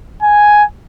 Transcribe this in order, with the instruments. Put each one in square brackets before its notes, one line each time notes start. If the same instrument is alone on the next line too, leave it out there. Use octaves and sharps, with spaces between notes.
[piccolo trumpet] G#5